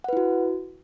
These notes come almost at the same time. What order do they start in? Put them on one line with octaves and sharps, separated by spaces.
F#5 B4 E4 F#4